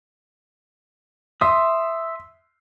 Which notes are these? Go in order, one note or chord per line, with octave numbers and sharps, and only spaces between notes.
E5 C6 D#6